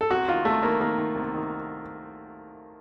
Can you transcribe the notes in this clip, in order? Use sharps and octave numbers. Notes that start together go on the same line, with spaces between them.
A4
C2 F#4
D#3 F4
C2 A3
D#3 A#3
D#3 A#3
D#3
C2
D#3